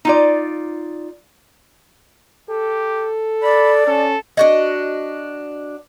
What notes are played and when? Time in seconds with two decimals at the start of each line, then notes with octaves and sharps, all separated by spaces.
0.05 D#4 F4 D5
2.50 G4 A4
3.43 D5 B5
3.87 C#4 A4
4.37 D4 F#4 D#5